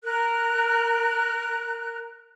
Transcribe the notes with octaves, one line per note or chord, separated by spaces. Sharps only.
A#4 F#6